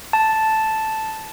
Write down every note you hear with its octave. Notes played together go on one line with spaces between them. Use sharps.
A5